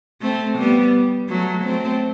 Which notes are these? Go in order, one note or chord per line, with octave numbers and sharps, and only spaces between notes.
A3 C4
G3 B3
F#3 A3
A3 C4